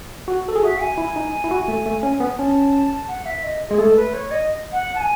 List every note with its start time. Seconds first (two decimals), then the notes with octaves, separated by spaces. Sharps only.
0.28 F#4
0.48 A4
0.56 G#4
0.63 F#4 E5
0.80 G#5
0.98 E4
1.16 D#4
1.44 E4
1.51 F#4
1.68 A3
1.86 A3
2.03 C#4
2.20 B3
2.39 C#4 A5
3.08 F#5
3.25 E5
3.43 D#5
3.69 G#3 G#4
3.78 A3 A4
3.96 B4
4.14 C#5
4.31 D#5
4.72 F#5
4.95 A5
5.00 G#5